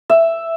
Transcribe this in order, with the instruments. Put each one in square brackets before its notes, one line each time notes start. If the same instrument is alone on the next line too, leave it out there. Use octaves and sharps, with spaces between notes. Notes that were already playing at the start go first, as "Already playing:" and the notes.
[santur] E5